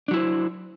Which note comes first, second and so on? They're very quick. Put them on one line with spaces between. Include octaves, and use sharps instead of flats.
D4 F#3 E4 C5